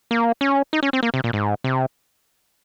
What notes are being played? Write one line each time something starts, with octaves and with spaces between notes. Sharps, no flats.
A#3
C#4
D#4
C#4
C4
A#3
C3
A#2
G#2
C3